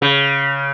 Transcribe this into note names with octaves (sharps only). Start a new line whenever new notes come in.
C#3